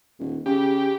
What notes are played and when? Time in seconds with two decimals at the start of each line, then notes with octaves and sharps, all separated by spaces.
0.19 D#1
0.46 C#3 G4